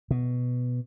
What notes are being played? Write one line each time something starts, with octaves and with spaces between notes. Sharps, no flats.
B2